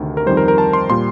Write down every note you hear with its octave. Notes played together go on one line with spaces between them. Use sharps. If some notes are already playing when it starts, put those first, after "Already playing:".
Already playing: D2 C3 D#3
A#4
F2 D#3 G3 C5
A#4
A#4
A5
C6
A#2 G3 C6